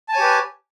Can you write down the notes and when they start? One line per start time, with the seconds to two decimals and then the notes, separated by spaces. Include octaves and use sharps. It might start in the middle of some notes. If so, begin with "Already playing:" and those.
0.09 A5
0.12 G#5
0.16 C#5
0.19 G4
0.23 B4